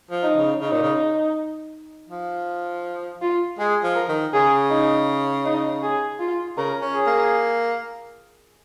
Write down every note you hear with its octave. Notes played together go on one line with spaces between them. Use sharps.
F3
D#4
C#3
C#3 D#4
A#2
C#3
F3
F4
G#3 G#4
F3
A#4
D#3
C#3 G#4
D#4
D#4
G#4
F4
C#3 A#4
C#4
G#4
A#3